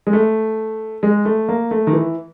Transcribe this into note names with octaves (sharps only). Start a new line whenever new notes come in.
G#3
A3
G#3
A3
A#3
A3
D#3
E3